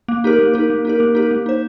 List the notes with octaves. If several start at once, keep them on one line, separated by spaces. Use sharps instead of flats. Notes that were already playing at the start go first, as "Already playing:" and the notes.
A#3
D#4 G4 A#4
A#3
D#4 G4 A#4
A#3
D#4 G4 A#4
A#3
D#4 G4 A#4
A#3
D#4 C5